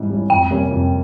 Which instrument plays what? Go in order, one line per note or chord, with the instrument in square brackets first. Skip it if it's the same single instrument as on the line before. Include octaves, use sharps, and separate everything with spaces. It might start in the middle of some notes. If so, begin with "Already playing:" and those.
Already playing: [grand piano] G#2 G3 C#4 E4
G3 C#4 E4
[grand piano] F2 [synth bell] G5
[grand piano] C3 G3 A#3 C#4
F2